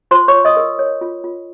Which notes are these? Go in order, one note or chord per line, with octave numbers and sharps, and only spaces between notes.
F4 C5 C6
C#5 C#6
F4
D#5 D#6
A#4
C#5
F4
F4